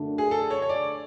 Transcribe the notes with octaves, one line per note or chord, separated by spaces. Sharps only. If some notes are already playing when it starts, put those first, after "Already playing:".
Already playing: F#2 D3 A3 D4
G#4
A4
C#5
C#5
D5